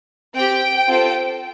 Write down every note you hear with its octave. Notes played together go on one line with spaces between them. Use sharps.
C4 G4 G5
C4 F4 A4